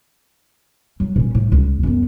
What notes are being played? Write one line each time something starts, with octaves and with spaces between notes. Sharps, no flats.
F#3
A#2 C#4
A2
C#2
F#2 B3